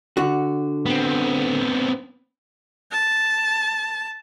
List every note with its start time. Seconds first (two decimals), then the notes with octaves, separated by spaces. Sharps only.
0.17 D3 F#4
0.86 B3 C4
2.92 A5